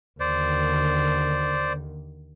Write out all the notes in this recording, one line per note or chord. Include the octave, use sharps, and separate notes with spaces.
D#2 D3 C5 D5